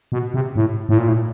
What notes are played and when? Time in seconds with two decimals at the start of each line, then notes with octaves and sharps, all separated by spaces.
0.12 B2
0.34 C3
0.56 A2
0.89 A2
0.98 A#2
1.08 A2